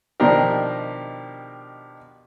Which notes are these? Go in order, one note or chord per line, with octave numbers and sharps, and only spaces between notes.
B2 D#3 F3 D4 G4 A#4